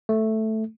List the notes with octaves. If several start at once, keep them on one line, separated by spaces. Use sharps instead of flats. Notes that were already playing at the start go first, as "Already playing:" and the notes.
A3